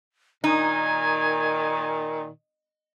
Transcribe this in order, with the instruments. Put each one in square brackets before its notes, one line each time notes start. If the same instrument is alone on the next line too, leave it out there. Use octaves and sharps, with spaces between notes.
[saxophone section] A#2 D#3 [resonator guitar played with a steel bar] D#4 [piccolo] G#5